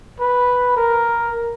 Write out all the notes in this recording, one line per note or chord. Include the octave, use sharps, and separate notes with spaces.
B4
A#4